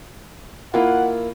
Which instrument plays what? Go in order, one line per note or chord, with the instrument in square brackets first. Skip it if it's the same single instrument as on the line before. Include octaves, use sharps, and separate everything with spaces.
[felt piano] A#3 E4 F4 [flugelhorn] F#5